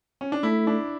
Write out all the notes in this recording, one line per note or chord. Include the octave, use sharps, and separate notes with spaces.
C#4
D4
A3 E4
D4